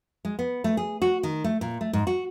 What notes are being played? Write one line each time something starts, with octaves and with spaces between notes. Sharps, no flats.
G#3
B3
A3
G#4
F#4
D#3
A3
A#2
A3
G#2
F#4